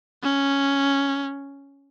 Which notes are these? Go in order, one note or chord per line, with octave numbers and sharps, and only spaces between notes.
C#4